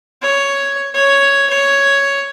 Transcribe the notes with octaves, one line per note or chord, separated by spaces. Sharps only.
C#5
C#5
C#5